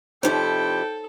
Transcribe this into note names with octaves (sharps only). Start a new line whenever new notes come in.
F2 C3 D#4 E4 A4 C5 C#5 G5